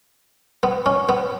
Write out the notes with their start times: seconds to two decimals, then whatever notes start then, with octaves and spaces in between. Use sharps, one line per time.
0.63 B3
0.86 C#4
1.09 B3